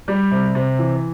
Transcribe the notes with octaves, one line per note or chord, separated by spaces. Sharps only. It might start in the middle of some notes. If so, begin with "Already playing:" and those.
G3
C3
C3
E3